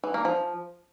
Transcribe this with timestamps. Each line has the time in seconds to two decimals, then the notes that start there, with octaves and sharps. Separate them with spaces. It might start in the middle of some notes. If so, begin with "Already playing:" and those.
0.04 E3
0.14 A#3
0.25 F3